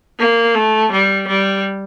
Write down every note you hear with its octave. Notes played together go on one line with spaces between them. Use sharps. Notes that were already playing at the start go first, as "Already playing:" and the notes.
A#3
A3
G3
G3